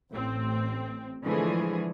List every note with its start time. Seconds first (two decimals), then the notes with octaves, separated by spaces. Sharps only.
0.10 A1 C4
1.22 D3 E3 F3 G#3 A3 G#4